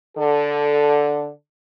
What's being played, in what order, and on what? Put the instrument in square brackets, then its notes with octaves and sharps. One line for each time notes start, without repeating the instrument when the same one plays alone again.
[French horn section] D3 A4